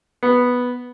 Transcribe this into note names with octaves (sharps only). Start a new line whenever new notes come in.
B3